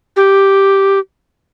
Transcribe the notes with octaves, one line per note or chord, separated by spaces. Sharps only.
G4